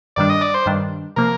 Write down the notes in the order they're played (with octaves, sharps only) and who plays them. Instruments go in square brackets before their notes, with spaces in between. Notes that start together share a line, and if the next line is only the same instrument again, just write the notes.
[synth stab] G2 D#3 G3 D4 [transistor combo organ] D5
[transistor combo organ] D#5
D5
C5
[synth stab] G2 D#3 G3 D4
[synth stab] C3 F3 A#3 [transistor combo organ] A#4